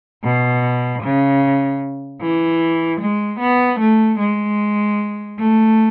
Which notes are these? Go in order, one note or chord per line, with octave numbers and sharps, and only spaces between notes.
B2
C#3
E3
G#3
B3
A3
G#3
A3